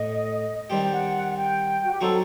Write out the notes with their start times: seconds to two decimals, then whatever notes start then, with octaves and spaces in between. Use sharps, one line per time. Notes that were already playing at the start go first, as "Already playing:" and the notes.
Already playing: A2 A3 D#5
0.70 D#3 G3 C4 G4
0.81 G5
0.92 F#5
1.36 G5
1.83 F#4
1.92 G4
2.01 F#3 C4 D#4 F#4 A4